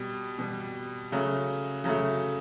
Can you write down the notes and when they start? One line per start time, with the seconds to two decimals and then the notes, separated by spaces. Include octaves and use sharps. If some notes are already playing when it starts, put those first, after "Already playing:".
Already playing: B2 G3
0.39 B2 G3
1.12 C#3 F#3 A3
1.84 C#3 F#3 A3